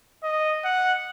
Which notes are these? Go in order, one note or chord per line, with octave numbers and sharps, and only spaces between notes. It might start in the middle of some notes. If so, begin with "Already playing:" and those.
D#5
F#5